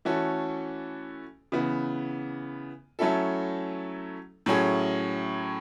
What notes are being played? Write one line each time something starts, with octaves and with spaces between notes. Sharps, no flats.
E3 A3 C#4 F#4 A4
C#3 E3 B3
F#3 A3 C#4 E4 A4
A2 F#3 C#4 G#4